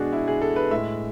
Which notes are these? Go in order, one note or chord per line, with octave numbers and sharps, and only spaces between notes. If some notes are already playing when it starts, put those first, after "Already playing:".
Already playing: B2 G#3 D4 F#4 G#4
E4
G#4
A4
B4
A2 G#3 E5